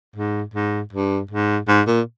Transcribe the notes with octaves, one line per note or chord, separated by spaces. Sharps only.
G#2
G#2
G2
G#2
G#2
A#2